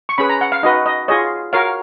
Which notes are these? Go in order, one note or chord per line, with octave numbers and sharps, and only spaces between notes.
C#6
C#4 G#4 B4 B5
A#5
F#5
F5
D#4 F#4 B4 D#5
D#5
F4 G#4 C#5 D#5
F#4 A#4 C#5 F5